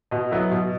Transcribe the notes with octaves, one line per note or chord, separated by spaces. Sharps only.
B2 D#5
F#3 B3 E4
B2